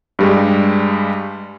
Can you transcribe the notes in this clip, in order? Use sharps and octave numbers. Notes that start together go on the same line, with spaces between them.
G2 G3 G#3